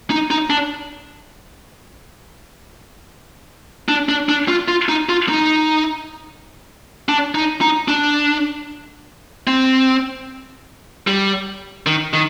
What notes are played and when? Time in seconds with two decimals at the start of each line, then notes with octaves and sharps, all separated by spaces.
0.10 D#4
0.31 D#4
0.50 D4
3.88 D4
4.09 D4
4.29 D4
4.48 F4
4.68 F4
4.89 D#4
5.09 F4
5.29 D#4
7.09 D4
7.35 D#4
7.61 D#4
7.88 D4
9.47 C4
11.07 G3
11.86 D#3
12.13 D#3